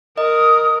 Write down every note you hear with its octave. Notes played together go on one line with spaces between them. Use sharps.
A#4 D#5 D#6